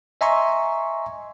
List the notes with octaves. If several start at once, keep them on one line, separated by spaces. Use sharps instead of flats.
D#5 E5 G#5 A#5 C6 C#6